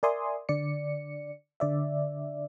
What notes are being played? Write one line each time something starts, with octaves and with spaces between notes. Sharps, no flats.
A#4 D5 E5 G#5 C6 D#6
D3 D5 C#7
D3 D5 E5